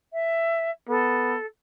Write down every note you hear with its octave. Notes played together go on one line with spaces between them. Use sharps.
E5
B3 A4